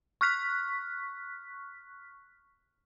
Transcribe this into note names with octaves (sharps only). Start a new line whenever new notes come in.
C#6 F6 F#6 B6